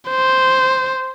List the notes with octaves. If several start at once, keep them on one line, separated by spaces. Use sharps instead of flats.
C5